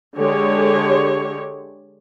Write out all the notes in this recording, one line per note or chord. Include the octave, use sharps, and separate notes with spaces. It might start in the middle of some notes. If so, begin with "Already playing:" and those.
D3 G#3 G4 C#5